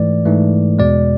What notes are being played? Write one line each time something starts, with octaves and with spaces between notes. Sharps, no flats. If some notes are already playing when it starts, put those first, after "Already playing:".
Already playing: G#2 E3 A3 D5
G#2 E3 A3
E2 B2 G#3 D5